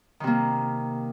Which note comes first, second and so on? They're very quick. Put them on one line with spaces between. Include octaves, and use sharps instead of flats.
D#3 C3 A#3